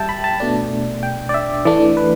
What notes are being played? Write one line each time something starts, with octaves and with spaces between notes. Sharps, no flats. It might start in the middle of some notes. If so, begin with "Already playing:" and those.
Already playing: G3 E5 G5 A5
B5
A5
B2 A3 D4
G5
D5
E5
E3 A3 D4 D5
B4